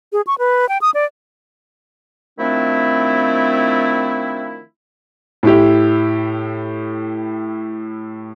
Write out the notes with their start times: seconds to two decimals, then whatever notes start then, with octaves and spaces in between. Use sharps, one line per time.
0.13 G#4
0.27 C#6
0.38 B4
0.69 G5
0.82 D#6
0.94 D5
2.38 D#3 F3 A3 C4 D4 E4
5.43 A2 E4 G4